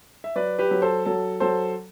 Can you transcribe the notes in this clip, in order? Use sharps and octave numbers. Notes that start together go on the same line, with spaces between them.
E5
F#3 B4 D5
G4 B4
F#3
A4 C5
F#3 A4
F#3 A4 C5